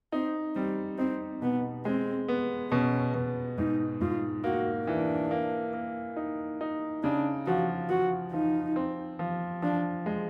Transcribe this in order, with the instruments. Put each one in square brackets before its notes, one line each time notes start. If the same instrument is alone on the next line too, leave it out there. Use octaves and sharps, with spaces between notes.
[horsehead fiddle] C4 [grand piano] D#4
[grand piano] G3 [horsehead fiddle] C4
[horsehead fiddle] C4 [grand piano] D#4
[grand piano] B2 [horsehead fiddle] B3
[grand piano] G#3 [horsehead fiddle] C4
[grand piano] B3
[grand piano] B2 [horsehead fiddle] C#4
[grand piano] B2
[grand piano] G#2 [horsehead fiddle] D#4
[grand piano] G#2 [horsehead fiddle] F4
[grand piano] A#3 [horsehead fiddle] F#4
[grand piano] E3 [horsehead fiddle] D4
[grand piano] A#3
A#3
D#4
D#4
[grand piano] C#3 [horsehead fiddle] D4
[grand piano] F3 [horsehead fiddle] F#4
[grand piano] F3 [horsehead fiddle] F#4
[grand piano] F3 [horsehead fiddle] D#4
[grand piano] C4
F3
[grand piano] F3 [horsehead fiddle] D4
[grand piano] G#3